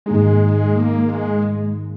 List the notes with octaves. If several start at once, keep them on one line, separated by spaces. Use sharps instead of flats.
G#2 D#3 G#3 A#3 D#4 G#4
A#3
G#3